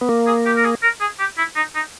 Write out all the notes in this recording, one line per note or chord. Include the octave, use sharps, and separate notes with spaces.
B3
A#3
G#4
G4
A#4
G#4
A#4
G#4
G4
E4
D#4
D#4